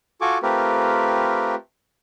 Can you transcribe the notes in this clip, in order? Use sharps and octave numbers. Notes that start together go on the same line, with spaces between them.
F4 F#4 A4 G#5 C#6 D6
A3 C4 F4 G4 A#4 B4